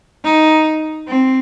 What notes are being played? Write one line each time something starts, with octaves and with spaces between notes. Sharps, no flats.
D#4
C4